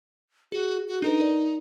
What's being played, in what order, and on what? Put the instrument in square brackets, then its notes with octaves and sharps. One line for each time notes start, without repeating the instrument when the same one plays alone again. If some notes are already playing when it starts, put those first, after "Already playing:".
[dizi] F#4 [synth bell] G#4
[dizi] F#4
[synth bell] D4 A4 B4 [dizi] D#4
[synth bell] A#4 D5